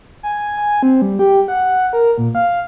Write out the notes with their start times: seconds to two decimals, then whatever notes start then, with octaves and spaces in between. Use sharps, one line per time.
0.23 G#5
0.57 G#5
0.83 C4
1.02 G3
1.19 G4
1.48 F#5
1.93 A#4
2.18 A#2
2.35 F5